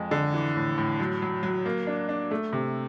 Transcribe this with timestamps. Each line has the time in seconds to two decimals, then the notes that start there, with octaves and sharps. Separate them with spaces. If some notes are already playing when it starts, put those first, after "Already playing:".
Already playing: F2 G#3
0.11 D3
0.34 E3
0.56 A2
0.78 A2
1.00 F#3
1.22 F#3
1.43 F#3
1.66 A#3
1.87 D4
2.09 D4
2.31 A3
2.53 C3